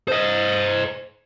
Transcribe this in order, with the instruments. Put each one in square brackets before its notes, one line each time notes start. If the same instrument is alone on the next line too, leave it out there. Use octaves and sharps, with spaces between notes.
[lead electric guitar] C5 D#5